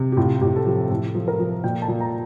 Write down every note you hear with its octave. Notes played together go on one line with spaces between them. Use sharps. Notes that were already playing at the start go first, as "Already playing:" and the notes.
Already playing: C3
G4
A2 F4
A2 G4
A4
F3 G4
A2 A4
F3
A#4
F3
A#2 G5
A5
A#2
A#5